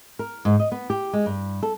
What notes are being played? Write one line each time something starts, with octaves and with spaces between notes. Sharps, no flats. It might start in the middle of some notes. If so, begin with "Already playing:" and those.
A#4
G#2
D#5
B3
G4
G#3
G2
A4